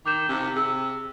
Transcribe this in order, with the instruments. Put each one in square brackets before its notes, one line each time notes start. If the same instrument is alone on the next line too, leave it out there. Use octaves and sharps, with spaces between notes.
[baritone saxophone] D#3 [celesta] D6 G6 E7
[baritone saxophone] C3
[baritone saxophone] C3 [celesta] G#4 E6